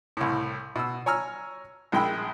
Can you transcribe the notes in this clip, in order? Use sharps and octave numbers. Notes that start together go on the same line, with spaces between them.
C2 A2
B2 E6
C#5 G#5 A#5 E6 F6
A#1 G#3 G5 B5 E6